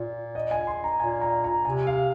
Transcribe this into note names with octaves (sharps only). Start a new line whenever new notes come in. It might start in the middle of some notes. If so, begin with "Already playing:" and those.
Already playing: A#2
D#5
G#5
C6
A#5
A#2 G#5
A#5
A#5
C3 G#5
F5